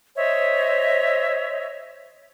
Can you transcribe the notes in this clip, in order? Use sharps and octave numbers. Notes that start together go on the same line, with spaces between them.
C5 C#5 D#5 E5